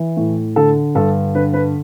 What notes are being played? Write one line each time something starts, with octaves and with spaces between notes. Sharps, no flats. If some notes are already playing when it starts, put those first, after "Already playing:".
Already playing: E3
A2
D3 A4
G2 A4
D3 B4
B4